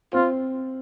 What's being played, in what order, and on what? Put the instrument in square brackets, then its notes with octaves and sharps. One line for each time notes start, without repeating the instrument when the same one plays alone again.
[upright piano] C4 [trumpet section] F4